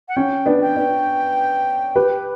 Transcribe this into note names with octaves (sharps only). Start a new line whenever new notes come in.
F#5
C#4 G5
B3 D4
G5
B3 D4
G4 B4